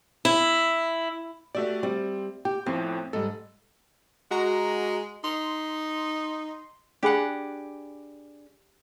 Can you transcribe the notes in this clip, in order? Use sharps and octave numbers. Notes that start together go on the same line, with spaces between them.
E4
A3 F#4 G4 D5 E5
G3 C4
G4 G5
F2 A2 F3 C4
G#2 G3 A4
G#3 F#4 A#5
D#4 C6
D4 G4 G#4 F#5 B5